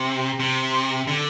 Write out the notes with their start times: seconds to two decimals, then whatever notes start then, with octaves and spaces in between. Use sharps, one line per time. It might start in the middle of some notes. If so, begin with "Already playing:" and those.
Already playing: C3
0.40 C3
1.08 D3